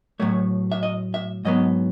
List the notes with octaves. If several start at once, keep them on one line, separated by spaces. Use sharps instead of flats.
A2 F#3 A3 C#5
E5
D#5
E5
G#2 F#3 B3 D#5